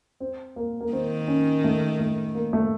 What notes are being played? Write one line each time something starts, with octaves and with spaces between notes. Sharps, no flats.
C4
A#3
A#3
D#3 C4
C#4
A3
A3
A#3
A3